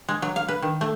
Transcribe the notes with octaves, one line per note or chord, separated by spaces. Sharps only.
G#3
F#3
F5
B4
D#3
A3